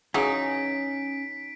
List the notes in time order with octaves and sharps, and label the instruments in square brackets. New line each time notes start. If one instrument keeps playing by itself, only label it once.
[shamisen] C#3 E3 F#3 [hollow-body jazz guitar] C#4 G#4 [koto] D#4 [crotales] B6 D7